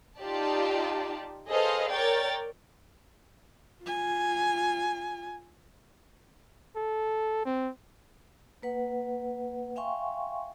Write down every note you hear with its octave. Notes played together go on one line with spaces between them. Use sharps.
D#4 F4 G4 D5 A5
G#4 A4 B4 C5 D#5 F5
A#4 C#5 D5 G5 A6
F4 G#5
A4
C4
A#3 B4 F#5
E5 F5 G5 G#5 C6 C#6